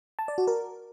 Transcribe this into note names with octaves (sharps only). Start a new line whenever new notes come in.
A5
D5
F#4
A#4